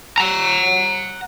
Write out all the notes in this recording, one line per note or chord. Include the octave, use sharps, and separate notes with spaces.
F#5 A#5